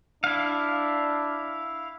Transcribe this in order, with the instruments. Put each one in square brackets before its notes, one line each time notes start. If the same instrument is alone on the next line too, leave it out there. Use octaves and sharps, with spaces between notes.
[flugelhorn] D4 [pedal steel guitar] E4 F5